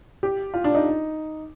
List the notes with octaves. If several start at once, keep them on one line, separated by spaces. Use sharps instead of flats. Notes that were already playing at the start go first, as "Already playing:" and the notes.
G4
F4
D4
D#4